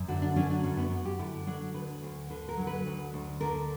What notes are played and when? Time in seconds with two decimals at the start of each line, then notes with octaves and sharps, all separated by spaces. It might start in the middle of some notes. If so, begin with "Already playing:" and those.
Already playing: F#2
0.08 D3 F#4
0.22 D4
0.36 F#3 C#4
0.50 D4
0.64 F#2 C#4
0.77 B3
0.91 F#2
1.05 G4
1.19 D3 E4
1.46 F#3 D4
1.75 D2 B4
2.02 D2
2.30 D3 B4
2.49 A#4
2.57 F#3
2.67 B4
2.85 D2
3.14 D2
3.41 D3 A#4